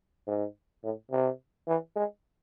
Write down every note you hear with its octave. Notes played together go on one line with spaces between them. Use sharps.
G#2
A2
C3
E3
G#3